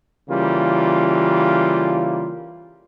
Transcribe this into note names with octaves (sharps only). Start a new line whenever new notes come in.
C#3 E3 G3 A#3 F4